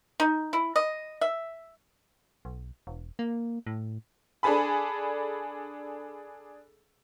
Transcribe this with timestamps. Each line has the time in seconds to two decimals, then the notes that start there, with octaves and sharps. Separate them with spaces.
0.20 D#4
0.53 E4
0.76 D#5
1.21 E5
2.45 B1
2.87 E1
3.19 A#3
3.67 A2
4.43 D4 G#4 A4 G#5 B5